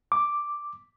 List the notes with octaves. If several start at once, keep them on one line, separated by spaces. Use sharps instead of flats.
D6